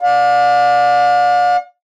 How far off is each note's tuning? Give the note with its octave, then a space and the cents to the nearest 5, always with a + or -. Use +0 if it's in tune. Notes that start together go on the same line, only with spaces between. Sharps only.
D5 +0 F5 +45